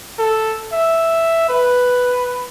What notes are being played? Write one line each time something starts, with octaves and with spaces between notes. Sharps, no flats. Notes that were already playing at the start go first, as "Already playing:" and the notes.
A4
E5
B4